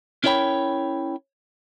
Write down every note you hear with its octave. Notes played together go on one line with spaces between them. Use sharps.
C#4 E4 A#4 C#5 G5 B5